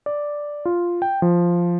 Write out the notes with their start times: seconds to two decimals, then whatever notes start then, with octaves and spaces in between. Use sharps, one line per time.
0.06 D5
0.65 F4
1.02 G5
1.22 F3